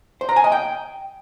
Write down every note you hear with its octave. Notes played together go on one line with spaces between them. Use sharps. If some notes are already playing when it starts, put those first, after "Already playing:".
C5
A#5
G#5
D#5
G5